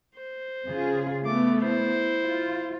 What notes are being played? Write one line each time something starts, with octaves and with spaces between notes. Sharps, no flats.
C5
C#3 F4 G#4
A3 B3 D6
E4 C5
F4